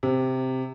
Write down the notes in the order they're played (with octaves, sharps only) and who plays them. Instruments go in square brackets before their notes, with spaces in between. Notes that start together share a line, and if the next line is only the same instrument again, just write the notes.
[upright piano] C3